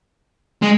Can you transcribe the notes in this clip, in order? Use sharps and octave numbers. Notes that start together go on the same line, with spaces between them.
G#3